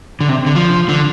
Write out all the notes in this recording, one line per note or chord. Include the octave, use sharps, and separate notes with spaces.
D3
C3
D3
F3
D3